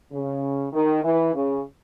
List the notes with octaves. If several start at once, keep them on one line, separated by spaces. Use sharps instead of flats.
C#3
D#3
E3
C#3